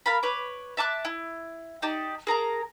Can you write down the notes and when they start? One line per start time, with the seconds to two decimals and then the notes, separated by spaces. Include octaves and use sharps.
0.06 A#4 F5 A5 B5
0.23 B4 C#5 D6
0.77 E5 A5 D6 F#6
1.05 E4
1.82 D#4 G4 D5 A5
2.27 G#4 A#4 A5 A#5